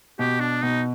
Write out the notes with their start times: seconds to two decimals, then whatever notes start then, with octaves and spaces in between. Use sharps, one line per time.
0.19 B2 G4
0.40 D4
0.63 B2 D#4